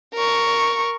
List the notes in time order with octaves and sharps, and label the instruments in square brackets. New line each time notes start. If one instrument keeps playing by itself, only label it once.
[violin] A#4 C#6